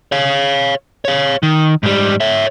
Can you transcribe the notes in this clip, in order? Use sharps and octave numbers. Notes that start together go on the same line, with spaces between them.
C#5 F5
C#5 F5
D#3
G#2 G3
C#5 E5